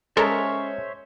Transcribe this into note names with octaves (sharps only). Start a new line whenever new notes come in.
G#3 C#4 A4 A#4 C5 C#5 E5